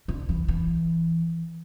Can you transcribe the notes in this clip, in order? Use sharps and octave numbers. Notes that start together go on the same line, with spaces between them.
D3
E3
E3